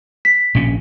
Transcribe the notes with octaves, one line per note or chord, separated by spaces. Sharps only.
B6
A#1 A#2 C#4